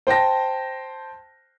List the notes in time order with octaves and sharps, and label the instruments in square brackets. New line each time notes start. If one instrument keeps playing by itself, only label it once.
[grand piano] C5 G5 A5 A#6